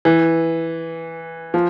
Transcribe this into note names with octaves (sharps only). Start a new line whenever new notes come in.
E3
F3